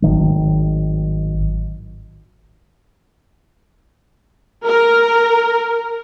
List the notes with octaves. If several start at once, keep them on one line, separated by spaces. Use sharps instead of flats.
G#1 A2 D#3 F#3
A#4